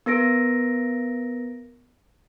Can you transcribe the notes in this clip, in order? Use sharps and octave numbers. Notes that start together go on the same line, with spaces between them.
B3 A#4 A#6 D7